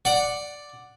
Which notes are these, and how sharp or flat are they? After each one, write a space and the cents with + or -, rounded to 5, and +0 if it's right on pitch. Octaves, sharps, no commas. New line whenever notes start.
D5 +0 F#5 +0